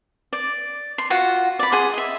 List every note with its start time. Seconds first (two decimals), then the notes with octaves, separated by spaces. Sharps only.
0.33 D5
0.98 C6
1.10 F4 F#4 F#5
1.59 D5 B5
1.72 G#4 F#5 C6
1.93 D#5 E5